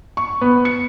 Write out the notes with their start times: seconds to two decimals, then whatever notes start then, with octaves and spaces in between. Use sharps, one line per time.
0.17 C#6
0.41 B3
0.65 C#7